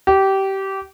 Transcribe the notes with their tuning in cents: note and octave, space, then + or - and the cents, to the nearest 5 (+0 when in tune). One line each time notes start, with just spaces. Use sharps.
G4 -20